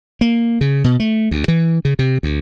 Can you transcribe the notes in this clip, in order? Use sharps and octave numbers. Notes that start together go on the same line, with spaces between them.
A#3
C#3
B2
A3
D2
E3
C#3
C3
D2